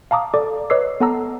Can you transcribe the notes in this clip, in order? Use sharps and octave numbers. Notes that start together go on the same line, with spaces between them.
F5 A5 A#5 D6 D#6
A4 D5 D6
B4 C#5 D#5 D6 E6 C7
B3 A4 F#5 A5 A#5 E6